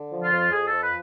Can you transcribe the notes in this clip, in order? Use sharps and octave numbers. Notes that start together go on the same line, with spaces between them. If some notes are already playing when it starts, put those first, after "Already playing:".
Already playing: D3
F3
F4
F2
F2 G#4
F3 A4
B4